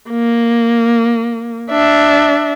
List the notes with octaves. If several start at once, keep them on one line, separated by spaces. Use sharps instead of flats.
A#3
D4 E5